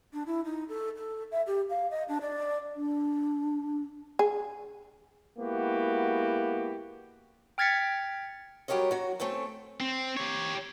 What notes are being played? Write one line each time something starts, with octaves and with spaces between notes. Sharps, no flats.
D4
E4
D#4
A4
A4
E5
G4
F5
D#5
D4
D5
D4
G#4
G#3 A#3 B3 E4 F#4 G4
G5 F6 G#6 A6 B6 C#7
F#3 G3 G4 A#4 C#5 D#5
F#3 F#4
A3 C4 C#4 A4
C4
G4 C#5